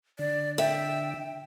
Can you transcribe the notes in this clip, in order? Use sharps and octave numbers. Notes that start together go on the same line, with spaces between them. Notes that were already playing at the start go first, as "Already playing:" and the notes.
D3 D5
E5 G5